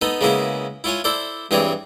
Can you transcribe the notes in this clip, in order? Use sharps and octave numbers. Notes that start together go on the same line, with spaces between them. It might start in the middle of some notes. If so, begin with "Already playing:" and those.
B3 D#4 A4
C#3 G#3 A#3 B3 E4
E4 F4 C#5 G#5
E4 A4 C5 D5
G2 E3 C4 G#4 C#5 D5